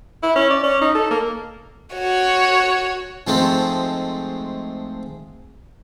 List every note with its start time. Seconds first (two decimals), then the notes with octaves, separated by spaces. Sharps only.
0.23 E4
0.36 C#4
0.50 D5
0.64 C#4
0.82 D#4
0.95 A4
1.11 A#3
1.94 F#4 C#5
3.27 G#2 F3 G#3 A3 C4